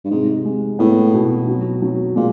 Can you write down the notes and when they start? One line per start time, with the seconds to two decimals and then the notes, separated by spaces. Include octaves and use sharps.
0.04 G2
0.11 G#2 C3
0.45 G#3
0.79 A2 B3
1.13 B2
1.48 F#3
1.82 F#3
2.16 A#2 G#3